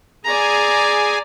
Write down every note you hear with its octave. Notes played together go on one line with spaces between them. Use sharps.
G#4 D5 G#5 A#5